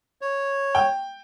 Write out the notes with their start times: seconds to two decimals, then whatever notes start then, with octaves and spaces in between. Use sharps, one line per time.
0.21 C#5
0.75 G5